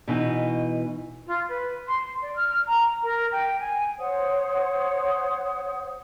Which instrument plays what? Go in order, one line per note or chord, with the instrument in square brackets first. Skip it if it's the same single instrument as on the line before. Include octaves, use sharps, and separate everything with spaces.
[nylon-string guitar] B2 E3 D#4
[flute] F4
B4
C6
D5
F6
A#5
A#4
G5
G#5
[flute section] C5 C#5 F#5 D#6